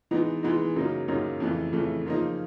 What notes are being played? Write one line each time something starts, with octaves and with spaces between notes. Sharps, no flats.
E3 G#3 B3 D#4
E3 G#3 B3 D#4
F#2 C#3 F#3 A#3 D#4
F#2 C#3 F#3 A#3 D#4
F2 C#3 E3 A3
F2 C#3 E3 A3
C#3 F3 A#3 D#4